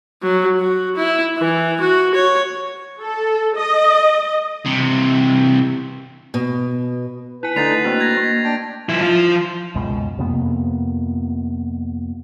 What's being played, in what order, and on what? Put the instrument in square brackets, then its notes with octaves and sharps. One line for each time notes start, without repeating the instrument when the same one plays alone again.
[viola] F#3
F#4
E4
E3
F#4
C#5
[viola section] A4
D#5
[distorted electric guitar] C3 E3
[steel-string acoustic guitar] B2
[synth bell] E4 G#5 [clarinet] B4
[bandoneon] D3 D#4 [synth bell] A3 [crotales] A6 C7 F7
[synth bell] A#3 D4 F#4 [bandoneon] C4
[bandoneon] A#5 [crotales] G#6 A#6
[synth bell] A#3
[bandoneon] D4 G5
[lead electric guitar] F3 E4
F3 F4
[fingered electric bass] C#2 F#2 B2 G#3
F2 C3 A#3 B3